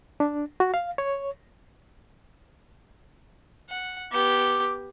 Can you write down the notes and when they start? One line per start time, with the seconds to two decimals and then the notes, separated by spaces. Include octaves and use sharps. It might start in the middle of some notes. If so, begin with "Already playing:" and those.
0.20 D4
0.60 F#4
0.74 F5
0.98 C#5
3.69 F#5
4.12 B3 G4 D6